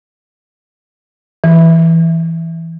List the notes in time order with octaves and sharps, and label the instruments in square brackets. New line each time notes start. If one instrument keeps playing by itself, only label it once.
[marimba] E3